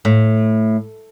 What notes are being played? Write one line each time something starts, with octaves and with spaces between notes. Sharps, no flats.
A2